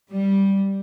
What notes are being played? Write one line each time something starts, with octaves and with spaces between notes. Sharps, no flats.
G3